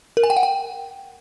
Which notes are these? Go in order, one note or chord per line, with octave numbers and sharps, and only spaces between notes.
A#4
G#5
G5
F#5
G5